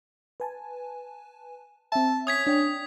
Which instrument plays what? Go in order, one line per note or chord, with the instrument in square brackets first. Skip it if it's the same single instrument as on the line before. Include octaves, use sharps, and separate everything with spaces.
[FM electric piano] B4 G#5 A5
[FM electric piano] C4 E5 [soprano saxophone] A5
[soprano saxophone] C#4 [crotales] D#6 G#6 B6
[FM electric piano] D4 C#5 G5